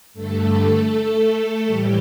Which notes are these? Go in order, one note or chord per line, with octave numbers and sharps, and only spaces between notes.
G2 D3 A3 A4
A2 E3 G3 G4